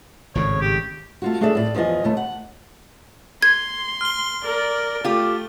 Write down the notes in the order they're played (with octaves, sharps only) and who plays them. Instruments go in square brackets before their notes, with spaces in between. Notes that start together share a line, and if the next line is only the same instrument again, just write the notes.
[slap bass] G#1 A2 C#3 [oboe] C#5
[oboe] G4
[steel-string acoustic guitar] A3 F4 F#4
A3 D4 G#4 A4 D5 E5
A2 D5
E2 F3 B3 D#5 G#5
D#2 A3 E4
F#5
[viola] C6 [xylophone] G#6
[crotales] F6 G7
[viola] A#4 D5
[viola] A3 [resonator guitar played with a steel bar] F4 G4